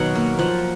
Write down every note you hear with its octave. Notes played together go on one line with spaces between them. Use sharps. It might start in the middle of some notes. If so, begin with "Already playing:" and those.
Already playing: B2 D#3 F#3 F#5
A#3
F3 F#5